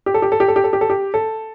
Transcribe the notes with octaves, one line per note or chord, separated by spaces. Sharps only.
G4
A4
G4
A4
G4
A4
G4
A4
G4
A4
G4
A4